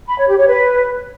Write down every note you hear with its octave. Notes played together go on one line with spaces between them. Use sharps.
B5
C#5
G4
C#5
B4